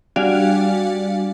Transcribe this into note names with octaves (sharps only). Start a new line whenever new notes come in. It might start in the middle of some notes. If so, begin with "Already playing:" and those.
G3 D4 F#4 D5 F5 G#5